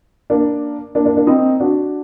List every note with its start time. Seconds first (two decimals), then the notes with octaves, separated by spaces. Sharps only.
0.30 A#3 D4
0.95 A#3 D4
1.06 A#3 D4
1.17 A#3 D4
1.27 C4 D#4
1.60 D4 F#4